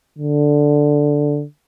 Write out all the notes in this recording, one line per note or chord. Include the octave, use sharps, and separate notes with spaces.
D3